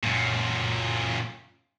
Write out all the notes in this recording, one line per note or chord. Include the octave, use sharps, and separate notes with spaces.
F#2 A#2